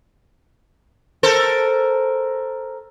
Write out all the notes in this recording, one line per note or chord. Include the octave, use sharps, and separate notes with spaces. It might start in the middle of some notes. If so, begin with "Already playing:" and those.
A4 A#4 C5